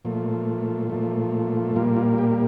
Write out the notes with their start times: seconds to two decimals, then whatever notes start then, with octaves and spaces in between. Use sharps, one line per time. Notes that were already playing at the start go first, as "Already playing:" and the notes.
0.05 A#2 F3 A3
0.90 A#2 F3 A3
1.76 A#2 G3 A#3 F4
1.96 F4
2.18 G4